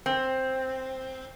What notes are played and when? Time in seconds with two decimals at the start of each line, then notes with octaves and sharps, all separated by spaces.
0.06 C4